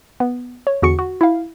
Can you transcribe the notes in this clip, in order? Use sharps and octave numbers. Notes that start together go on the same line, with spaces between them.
B3
C#5
E2 D3 F#4 G#4 C#6 C#7
F#4
E4 F5